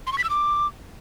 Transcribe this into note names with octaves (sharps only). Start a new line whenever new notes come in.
C6
C#6
B6
E6
D6